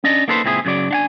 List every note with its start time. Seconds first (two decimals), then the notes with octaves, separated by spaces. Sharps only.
0.04 C#4 D4 D5 D#5
0.28 A#3 D#4 A4 B4 C5
0.44 C#2 A#2 C4 E4 F#4 G#4
0.65 F#2 C#3 F#3 D5
0.91 D4 F#5 G#5